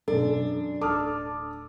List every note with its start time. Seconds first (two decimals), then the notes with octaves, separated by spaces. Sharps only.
0.08 F#2 B2 E3 D4 A4
0.81 D1 D#4 A4 D6 D#6 F6